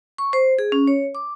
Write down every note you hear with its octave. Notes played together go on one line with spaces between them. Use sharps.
C#6
C5
G#4
C#4
C#5
D6